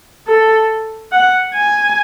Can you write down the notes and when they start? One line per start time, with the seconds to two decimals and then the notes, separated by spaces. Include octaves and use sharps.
0.27 A4
1.12 F#5
1.55 G#5